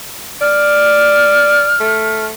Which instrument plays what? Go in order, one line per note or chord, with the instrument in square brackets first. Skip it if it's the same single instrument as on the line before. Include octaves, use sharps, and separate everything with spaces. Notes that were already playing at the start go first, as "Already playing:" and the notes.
[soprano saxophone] D5 [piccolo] F6
[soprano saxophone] A3